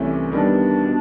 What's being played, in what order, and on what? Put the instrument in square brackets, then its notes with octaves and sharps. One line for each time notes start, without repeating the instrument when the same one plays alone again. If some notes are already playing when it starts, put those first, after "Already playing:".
Already playing: [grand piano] C2 C3 E3 A3 C#4
[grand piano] D#3 G3 B3 [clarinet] D4
[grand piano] B2